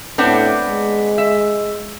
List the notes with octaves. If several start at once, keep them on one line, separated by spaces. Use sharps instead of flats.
A2 B3 C4 D4
G#3
E5